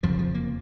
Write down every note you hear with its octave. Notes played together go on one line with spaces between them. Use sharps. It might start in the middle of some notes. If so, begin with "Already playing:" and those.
F1 F2 C#3 F3
F3
A#3